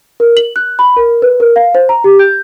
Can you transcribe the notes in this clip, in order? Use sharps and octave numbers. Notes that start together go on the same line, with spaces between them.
A#4
F#7
F#6
B5
A#4
B4
A#4
F5
C5
A#5
G4
G6